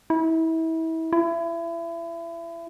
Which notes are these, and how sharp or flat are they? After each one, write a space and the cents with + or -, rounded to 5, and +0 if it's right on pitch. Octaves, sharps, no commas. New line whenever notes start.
E4 -30
E4 +30